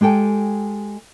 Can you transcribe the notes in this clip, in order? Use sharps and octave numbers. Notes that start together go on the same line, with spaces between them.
G#3 G4 A4 G5 G#5